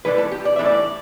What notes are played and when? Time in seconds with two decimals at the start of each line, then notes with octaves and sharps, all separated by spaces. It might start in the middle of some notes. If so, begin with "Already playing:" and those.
0.05 A2 E3 G3 D4 B4
0.18 A4
0.31 G4
0.45 D5
0.56 A2 E3 G3 D4 E5
0.65 D5